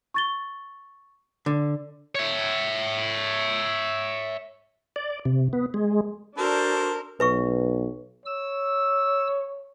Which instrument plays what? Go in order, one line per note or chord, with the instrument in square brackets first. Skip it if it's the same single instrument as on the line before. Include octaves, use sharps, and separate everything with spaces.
[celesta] C#6 A6 G7
[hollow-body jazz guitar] D3 [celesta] D5
[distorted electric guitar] C#5 E5
[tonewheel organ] D5
C3
B3
G#3
[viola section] D4 [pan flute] F#4 [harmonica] A4 C5 [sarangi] A#4
[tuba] B1 [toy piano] B4 E5 C#6
[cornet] C#5 [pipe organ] E6